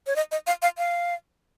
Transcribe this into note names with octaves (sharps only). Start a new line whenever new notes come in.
C#5
D#5
D#5
F5
F5
F5